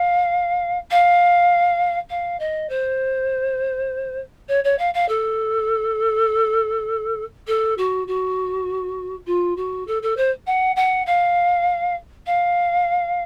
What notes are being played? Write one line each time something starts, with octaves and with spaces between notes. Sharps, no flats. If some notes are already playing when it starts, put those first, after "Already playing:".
Already playing: F5
F5
F5
D#5
C5
C#5
C#5
F5
F5
A4
A4
F#4
F#4
F4
F#4
A4
A4
C5
F#5
F#5
F5
F5